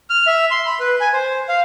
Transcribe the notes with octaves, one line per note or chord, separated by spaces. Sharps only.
F6
E5
C6
B5
B4
G#5
C5
F5